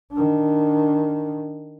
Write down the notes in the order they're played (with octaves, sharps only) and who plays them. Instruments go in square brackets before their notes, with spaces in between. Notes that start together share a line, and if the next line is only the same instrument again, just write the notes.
[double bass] D#3 D4